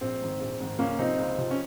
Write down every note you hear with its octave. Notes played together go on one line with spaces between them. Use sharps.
A#1 C4
G#2 D#3
A#1
G#2 D#3
C#2 A#3 C#4
C3 F3 C4 D#4
C#2
C3 F3
C#4